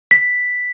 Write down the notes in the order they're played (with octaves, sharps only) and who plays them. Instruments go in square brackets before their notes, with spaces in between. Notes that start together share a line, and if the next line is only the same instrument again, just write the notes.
[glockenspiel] B6